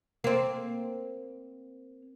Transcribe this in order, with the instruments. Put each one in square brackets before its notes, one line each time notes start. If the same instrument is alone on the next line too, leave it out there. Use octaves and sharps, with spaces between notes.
[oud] A#3 C4